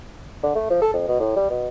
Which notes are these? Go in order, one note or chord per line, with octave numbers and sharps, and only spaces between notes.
D3
A3
F3
A4
F2
B2
A2
G3
B2